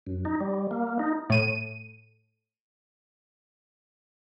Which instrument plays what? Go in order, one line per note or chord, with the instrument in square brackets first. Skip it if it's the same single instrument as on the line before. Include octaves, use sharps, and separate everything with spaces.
[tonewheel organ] F#2
D#4
G3
A#3
D#4
[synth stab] A2 D#7